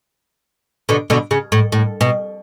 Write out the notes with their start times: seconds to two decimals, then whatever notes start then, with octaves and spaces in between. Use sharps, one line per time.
0.89 B2 D3
1.10 B2 D3
1.31 C#3
1.52 A2
1.72 A2
2.01 B2